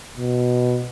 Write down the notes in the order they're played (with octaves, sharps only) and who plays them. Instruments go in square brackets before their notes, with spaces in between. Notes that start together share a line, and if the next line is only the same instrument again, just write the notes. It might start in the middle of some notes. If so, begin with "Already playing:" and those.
[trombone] B2